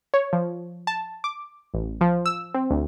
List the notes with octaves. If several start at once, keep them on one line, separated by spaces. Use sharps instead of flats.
C#5
F3
A5
D6
A1
F3
E6
C4
D2